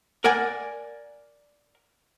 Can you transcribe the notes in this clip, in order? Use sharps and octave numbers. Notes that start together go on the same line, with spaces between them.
A#4 D5 F#5 G#5